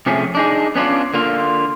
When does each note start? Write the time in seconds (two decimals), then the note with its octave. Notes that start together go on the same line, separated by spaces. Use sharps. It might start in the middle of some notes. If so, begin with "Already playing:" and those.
0.06 C3 F3 A3 C#4 G#4
0.35 D4 D#4 G#4
0.75 B3 C#4 D4 F4
1.14 D3 A#3 F4